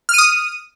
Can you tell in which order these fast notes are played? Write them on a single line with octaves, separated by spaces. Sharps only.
F6 D#7 D#6